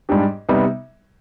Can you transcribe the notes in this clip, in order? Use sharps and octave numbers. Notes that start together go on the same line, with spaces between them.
G#2 G3 D4 G4
C3 G3 B3 D#4